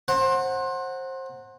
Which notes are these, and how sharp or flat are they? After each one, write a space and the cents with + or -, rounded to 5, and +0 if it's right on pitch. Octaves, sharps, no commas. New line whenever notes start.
C5 +25 F#5 -5 A#5 -30